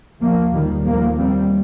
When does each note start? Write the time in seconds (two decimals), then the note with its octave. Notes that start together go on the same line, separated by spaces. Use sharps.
0.20 D#2 F3 A#3
0.53 D#3 G3
0.85 F3 A#3
1.18 G3 C4